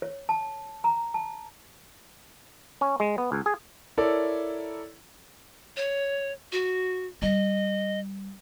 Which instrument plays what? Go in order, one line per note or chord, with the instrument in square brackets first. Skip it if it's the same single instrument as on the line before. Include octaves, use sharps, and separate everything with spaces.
[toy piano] C#5
A5
A#5
A5
[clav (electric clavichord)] C#4
G#3
B3
C#2
G#4
[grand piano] E4 A4 A#4 C#5 D5
[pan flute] C#5
F#4
[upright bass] G3 [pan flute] D#5